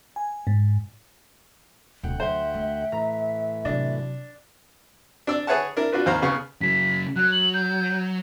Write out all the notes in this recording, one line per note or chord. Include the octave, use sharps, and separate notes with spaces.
G#5
G#2
D1 D2 B2 F#5 G5
F#3 C5 E5
A3
A2 E3 A#5
C3 F#3 D4
D4 D5 E6
G#4 B4 C#5 E5 F#5 A5
D4 E4 A#4
D4 F4 F#4 B4
D#2 C5 F5 A#5 B5
C#3 B3 F5 C#6
C#3 F#3 B6
F#3 F#6
F#7
G6